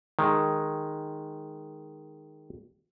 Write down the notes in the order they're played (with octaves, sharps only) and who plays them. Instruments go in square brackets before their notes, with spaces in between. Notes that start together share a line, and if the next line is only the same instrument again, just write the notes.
[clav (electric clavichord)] D#3 G#3